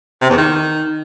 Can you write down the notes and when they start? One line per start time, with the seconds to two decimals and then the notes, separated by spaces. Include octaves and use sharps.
0.22 C3
0.30 E2
0.37 D#3